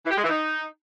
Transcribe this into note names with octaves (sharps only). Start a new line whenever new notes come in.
E3
G4
G#3
E3
D#4